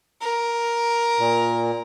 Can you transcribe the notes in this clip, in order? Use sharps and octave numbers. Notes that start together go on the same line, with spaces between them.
A#4
A#2